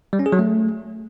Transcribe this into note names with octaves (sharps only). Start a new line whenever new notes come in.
G3
C#4
G#4
F#3
A3